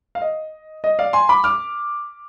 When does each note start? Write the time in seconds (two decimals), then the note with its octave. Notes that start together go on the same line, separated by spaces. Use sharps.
0.15 F5
0.21 D#5
0.84 D#5
0.99 D5 F5
1.13 G#5 C6
1.29 B5 D6
1.44 D6 F6